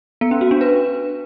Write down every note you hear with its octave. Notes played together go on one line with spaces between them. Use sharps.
B3
C#4
F#4
D4
B4